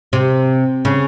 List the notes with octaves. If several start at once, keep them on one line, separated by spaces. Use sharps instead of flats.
C3
C#3